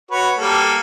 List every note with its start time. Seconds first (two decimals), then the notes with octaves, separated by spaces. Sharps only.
0.11 F#4 B4 C#5
0.38 G3 A#3 A4